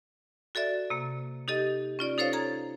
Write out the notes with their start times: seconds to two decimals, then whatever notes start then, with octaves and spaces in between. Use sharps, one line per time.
0.55 F#4 A4 D5 E5
0.90 C3 A#3
1.48 D#4 G4 A4 D#5
1.99 C#4 F4 D5
2.18 D#4 A4 C5 C#5 F5
2.33 A4 A#5 G#6